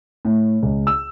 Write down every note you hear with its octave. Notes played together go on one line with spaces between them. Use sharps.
A2
C#2
E6